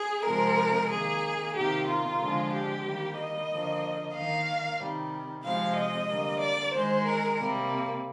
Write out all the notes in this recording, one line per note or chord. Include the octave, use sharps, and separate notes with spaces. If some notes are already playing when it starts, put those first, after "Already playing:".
Already playing: G#4
C3 F3 G#3 A#4
D#3 A#3 G#4
C3 D#3 A#3 G4
F4
D3 F3 G#3
G4
D#3 G3 A#3
D#5
D3 F3 A#3
D#3 A#3 F5
C3 D#3 G3
C3 F3 G#3 F5
D#5
D3 G3 A#3
D5
D#3 G#3 C5
A#4
C3 G3 A#3